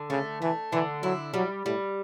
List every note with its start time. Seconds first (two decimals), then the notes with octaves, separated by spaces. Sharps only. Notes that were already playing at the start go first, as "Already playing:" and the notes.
Already playing: D3
0.10 C#3 A3
0.41 E3 A3
0.72 D3 E3
1.03 F#3 E4
1.34 F#3 G3
1.65 A2 G3